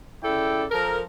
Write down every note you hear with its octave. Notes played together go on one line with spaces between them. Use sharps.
C#3 E4 A4 D5 G5
F3 A4 A#4